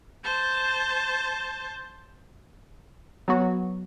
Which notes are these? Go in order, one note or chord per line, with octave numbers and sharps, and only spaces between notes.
C5 A5
F#3 B3 F#4